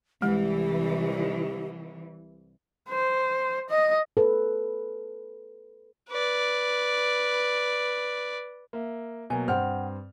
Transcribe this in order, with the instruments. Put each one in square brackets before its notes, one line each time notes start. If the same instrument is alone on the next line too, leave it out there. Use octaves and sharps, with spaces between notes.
[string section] C2 E3 [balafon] G#3 [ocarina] G4
[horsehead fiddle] C5
D#5
[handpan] A4 B4
[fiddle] B4 D5
[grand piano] A#3 E5
[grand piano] B2 F#3 A#3 [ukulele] G#5
[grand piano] G2 C4 F6 [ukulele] C5 F#5 G5